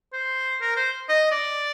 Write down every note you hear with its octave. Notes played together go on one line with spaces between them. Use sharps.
C5
A#4
C5
D#5
D5